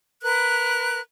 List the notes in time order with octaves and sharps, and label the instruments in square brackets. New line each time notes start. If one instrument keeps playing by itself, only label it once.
[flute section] A#4 B4 F#6